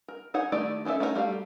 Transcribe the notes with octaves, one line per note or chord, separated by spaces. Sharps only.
A#4
D#4 G#4 C#5 F#5
D#3 A3 E4 G4 D5
D#3 C#4 D#4 A4 E5
A3 C#4 D#4 F#4 A#4
G3 A3 F#4 F5